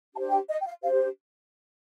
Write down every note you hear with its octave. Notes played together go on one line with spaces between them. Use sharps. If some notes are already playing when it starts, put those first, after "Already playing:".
D4 G4 C5 A5
G5
D#5
G5
F5
D4 G4 C5 F5